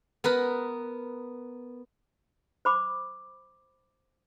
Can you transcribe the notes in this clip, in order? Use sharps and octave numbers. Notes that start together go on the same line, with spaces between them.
B3 A#4 B4
C5 B5 D6